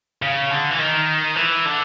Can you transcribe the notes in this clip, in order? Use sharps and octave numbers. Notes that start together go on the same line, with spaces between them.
C#3
D3
E3
D#3
E3
D3